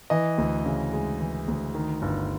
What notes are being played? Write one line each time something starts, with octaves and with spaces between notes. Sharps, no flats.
E3 D#5
D2
C#3
G#3
E3
D2
D#3
G1